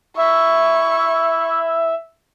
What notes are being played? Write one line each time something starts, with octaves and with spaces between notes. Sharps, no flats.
E4 E5 C#6